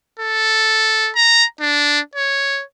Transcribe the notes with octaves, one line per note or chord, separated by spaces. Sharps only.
A4
A#5
D4
C#5